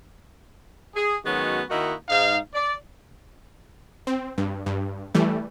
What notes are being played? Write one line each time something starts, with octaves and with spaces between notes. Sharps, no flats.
G#4
D#3 F#3 G#3 B3 C#4 F#4
D#3 A#3 D#4 E4 F#4
G#2 D#4 F5
D5
C4
G2
G2
E3 G3 A3